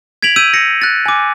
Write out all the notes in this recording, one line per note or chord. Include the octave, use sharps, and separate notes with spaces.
G#6 B6 D7 F7 F#7
E6 G6 D#7
A#6 C#7
F#6 A6
G#5 D6